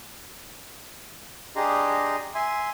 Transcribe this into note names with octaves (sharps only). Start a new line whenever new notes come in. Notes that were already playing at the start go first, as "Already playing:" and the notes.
D4 G4 G#4 D#5 A#5 C6
E5 G#5 C6